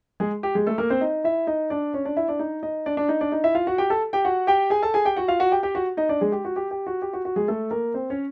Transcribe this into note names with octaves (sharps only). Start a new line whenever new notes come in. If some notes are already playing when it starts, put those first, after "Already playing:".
G#3 G#4
G4
G#3 G#4
A3 A4
A#3 A#4
C4 C5
D#4 D#5
E4 E5
D#4 D#5
D4 D5
C#4 C#5
D4 D5
E4 E5
D4 D5
D#4 D#5
D#4 D#5
D4 D5
D4 D5
D#4 D#5
D4 D5
D#4 D#5
E4 E5
F4 F5
F#4 F#5
G4 G5
A4 A5
G4 G5
F#4 F#5
G4 G5
G#4 G#5
A4 A5
G#4 G#5
G4 G5
F#4 F#5
F4 F5
F#4 F#5
G4 G5
G4 G5
F#4 F#5
D#4 D#5
D4 D5
G#3 G#4
G4
F#4
G4
G4
F#4
G4
F#4
F#4
G#3 G#4
A3 A4
A#3 A#4
C4 C5
C#4 C#5